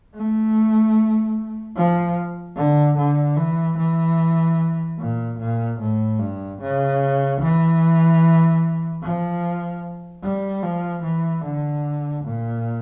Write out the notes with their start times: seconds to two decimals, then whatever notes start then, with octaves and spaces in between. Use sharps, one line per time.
0.15 A3
1.76 F3
2.56 D3
2.98 D3
3.37 E3
3.78 E3
4.98 A#2
5.39 A#2
5.80 A2
6.19 G2
6.61 C#3
7.41 E3
9.02 F3
10.23 G3
10.63 F3
11.03 E3
11.44 D3
12.24 A#2